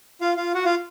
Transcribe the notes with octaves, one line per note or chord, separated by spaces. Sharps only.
F4 F5
F4 F5
F#4 F#5
F4 F5